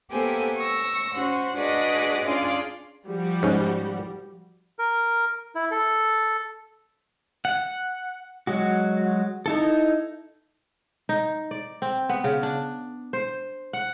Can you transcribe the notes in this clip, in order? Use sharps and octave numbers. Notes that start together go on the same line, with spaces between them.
A#3 B3 G4 A4 C5 G#5
C#6 E6 A#6
C#4 F#4 C5
D4 F#4 G#4 B4 D5 D#5
C#4 D4 F4 G#4 D5
F3 G3 F#4
G#2 C#4
A#4
E4
A4
F#5
F#3 G#3 F#4
D#4 E4 A4
D#4
D5
C4
B3
C#3
D4
C5
F#5